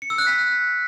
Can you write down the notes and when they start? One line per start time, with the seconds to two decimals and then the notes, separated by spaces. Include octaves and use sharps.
0.02 C#7
0.10 E6
0.18 F#6
0.27 B6